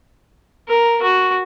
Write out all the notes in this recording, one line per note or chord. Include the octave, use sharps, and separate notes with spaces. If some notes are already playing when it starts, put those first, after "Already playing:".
A#4
F#4